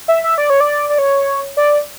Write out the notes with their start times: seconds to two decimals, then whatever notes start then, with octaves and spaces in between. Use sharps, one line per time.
0.08 E5
0.24 E5
0.38 D5
0.50 C#5
0.60 D5
0.89 D5
0.98 C#5
1.57 D5